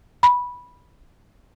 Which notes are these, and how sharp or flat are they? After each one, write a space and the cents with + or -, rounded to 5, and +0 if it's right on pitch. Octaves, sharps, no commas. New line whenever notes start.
B5 -10